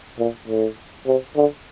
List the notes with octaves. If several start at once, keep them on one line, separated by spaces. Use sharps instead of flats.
A#2
A2
C3
D3